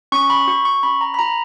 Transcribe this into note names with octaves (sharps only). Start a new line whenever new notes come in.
C#4 C#6
B5
F#4 C#6
C#6
C#4 B5
A#5
B5
F#4 A#5